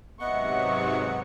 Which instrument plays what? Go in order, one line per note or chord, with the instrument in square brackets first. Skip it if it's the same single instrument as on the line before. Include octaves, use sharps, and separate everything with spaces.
[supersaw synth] G#2 C3 F#3 [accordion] B3 F#5 [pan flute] D#5 [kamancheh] E5 C#6